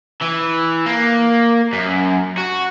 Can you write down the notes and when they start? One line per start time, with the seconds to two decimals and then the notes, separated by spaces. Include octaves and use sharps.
0.21 E3
0.86 A#3
1.73 F#2
2.38 F#4